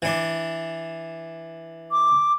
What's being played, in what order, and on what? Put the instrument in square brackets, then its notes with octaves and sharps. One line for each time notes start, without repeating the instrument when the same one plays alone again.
[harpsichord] E3 D4
[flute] D6